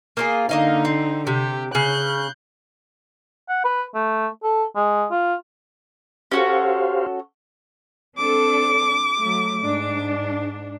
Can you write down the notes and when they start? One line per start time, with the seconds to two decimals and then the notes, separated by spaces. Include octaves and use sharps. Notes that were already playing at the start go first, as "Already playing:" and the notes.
0.17 A#3 F4 G#4
0.49 D3 A#3 D#4 D#5 F5
0.85 C4
1.27 C3 G4
1.75 C#3 F#6 G6
3.49 F#5
3.65 B4
3.95 A3
4.43 A4
4.76 G#3
5.11 F4
6.31 C#4 F#4 G4 A4 C5 F5
8.17 C4 D4 A4 D6
9.18 F#3 A3
9.60 G#2 D4